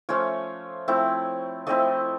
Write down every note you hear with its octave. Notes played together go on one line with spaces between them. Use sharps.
F3 A3 C#4 F4 C#5
F3 A3 C4 E4
F3 A3 C4 E4 D#5